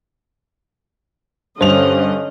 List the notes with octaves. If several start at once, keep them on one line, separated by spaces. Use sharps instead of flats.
G2 D3 C#4 C5 D#5 F7